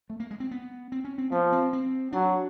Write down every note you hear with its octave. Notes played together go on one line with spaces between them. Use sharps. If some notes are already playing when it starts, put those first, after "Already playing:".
A3
A#3
G#3
C4
B3
C4
C#4
C4
F3 B3
C4
C4
F#3 D4